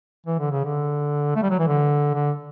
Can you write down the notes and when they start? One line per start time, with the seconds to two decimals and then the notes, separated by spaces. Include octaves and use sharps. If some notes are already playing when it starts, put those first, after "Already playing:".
0.26 E3
0.39 D3
0.51 C#3
0.65 D3
1.36 A3
1.42 G3
1.50 F#3
1.59 E3
1.67 D3
2.14 D3